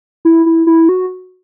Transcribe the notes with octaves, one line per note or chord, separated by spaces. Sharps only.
E4
E4
E4
F#4